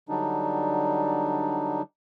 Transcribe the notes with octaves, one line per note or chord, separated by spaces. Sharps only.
D3 F#3 G3 D4 D#4